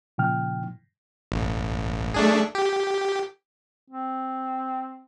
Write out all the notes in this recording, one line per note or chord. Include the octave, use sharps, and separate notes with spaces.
A#2 C#3 F3 G5 F6
A1
A3 D4 G#4
G4
C4